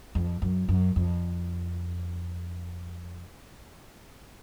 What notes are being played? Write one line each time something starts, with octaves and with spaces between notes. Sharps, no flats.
F2
F#2
F#2
F2